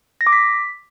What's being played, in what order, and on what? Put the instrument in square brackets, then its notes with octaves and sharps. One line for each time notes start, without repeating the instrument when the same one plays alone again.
[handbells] A#6
D6
B6